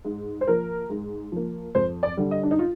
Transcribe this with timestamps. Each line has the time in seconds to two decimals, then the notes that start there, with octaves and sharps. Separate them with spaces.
0.05 G#2
0.41 C5
0.47 F3 A#3 A#4
0.90 G#2
1.32 F3 A#3
1.75 F2 C5
2.03 D5
2.17 D3 G3
2.31 D#5
2.43 D4
2.51 D#4
2.59 F4